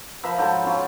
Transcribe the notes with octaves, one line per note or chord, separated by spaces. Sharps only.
F3 A#4 E5 B5
G#2 F#3 A4 G5
F#3 C#4 F4